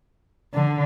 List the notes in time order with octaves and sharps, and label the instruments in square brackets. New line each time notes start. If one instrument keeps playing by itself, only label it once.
[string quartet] D3